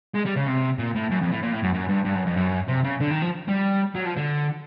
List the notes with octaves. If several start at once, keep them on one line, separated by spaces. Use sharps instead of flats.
G#3
G3
C#3
C3
A#2
A2
F#2
F2
A2
A#2
A2
F#2
F#2
G2
G2
F#2
F2
F#2
C3
C#3
D3
D#3
F3
G3
F#3
F3
D3